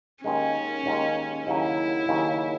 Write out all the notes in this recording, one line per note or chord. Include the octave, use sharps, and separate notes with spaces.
D#2 D#3 G#3 C#4
D#2 D#3 G#3
D#2 C#3 F#3 E4
D#2 C#3 F#3